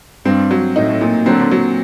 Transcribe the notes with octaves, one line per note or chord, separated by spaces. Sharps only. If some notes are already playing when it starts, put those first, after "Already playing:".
G2 C4
F#3
A2 D#4
A#2
D3 F#3 C4
F#3